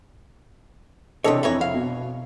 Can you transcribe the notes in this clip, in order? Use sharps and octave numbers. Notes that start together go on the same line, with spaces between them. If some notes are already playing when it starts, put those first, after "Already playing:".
C3 E3 D4 A4 C#5 D#5
F2 E3 E4 A#4 C#5
F5
B2